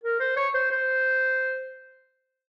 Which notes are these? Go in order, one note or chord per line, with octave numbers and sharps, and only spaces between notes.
A#4
C5
C#5
C5
C5